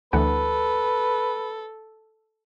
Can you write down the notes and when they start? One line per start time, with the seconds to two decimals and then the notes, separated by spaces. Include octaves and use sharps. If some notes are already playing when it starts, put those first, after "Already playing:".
0.13 D2 E3 A4 B4 F#5